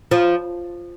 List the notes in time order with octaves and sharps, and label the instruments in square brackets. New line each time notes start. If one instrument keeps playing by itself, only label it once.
[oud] F3